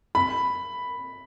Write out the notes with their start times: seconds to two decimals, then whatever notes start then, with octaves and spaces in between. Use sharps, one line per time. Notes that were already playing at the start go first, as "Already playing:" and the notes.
0.15 B5